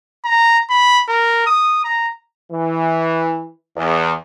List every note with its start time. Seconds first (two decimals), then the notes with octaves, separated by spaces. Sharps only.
0.25 A#5
0.70 B5
1.08 A#4
1.46 D#6
1.84 A#5
2.52 E3
3.77 E2